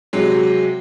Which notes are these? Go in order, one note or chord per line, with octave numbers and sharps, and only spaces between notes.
C3 F#3 G#3